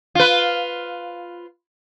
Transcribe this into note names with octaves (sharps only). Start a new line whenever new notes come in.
F4 B4